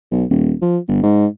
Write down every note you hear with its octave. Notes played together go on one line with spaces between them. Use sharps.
B1
D#1
F3
G1
G#2